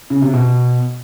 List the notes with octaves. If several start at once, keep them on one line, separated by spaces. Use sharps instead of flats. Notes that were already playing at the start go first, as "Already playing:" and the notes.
C#3
C3
B2